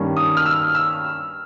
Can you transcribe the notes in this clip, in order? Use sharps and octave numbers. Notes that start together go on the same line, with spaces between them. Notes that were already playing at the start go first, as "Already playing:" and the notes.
Already playing: G2 D#3 G3 A#3 C#4
D#6
F6
E6
E6